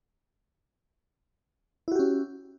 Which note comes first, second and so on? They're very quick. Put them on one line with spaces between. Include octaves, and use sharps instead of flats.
E4 F#4 G4 C#4